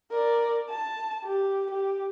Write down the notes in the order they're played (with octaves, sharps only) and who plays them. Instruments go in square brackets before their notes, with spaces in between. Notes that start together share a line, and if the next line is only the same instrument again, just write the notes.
[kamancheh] A#4 D5
A5
G4
G4